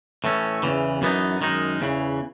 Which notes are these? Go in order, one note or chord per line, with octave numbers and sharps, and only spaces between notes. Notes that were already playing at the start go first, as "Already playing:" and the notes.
A2 E3 A3 C#4
E2 C#3 E3
F#2 E3 B3 D#4
F#2 D#3 G#3 D#4
E2 C#3 E3